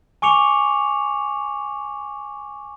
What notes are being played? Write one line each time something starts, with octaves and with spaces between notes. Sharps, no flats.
G#5 C#6 D6 C#7 F7